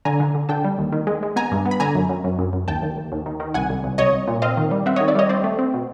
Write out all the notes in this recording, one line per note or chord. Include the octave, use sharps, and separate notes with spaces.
D3 G#5 A#5
D3
D3
D3 G5 A5
G3
D#2
D#3
G#3
G#3
B3 G#5 A#5
G2
B3
B5
D3 G#5 A#5
F#2
F#2
F#2
F#2
F#2
D#2 G5 A5
D#2
D#2
D#2
D#3
D#3
C2 F#5 G#5
C2
C2
C2 C#5 D#5
C2
A#2
C4 D#5 F5
D#3
G3
C4 E5 F#5
D#3 C#5 D#5
D5 E5
G3 C#5 D#5
C4 C5 D5
A3
C4
B2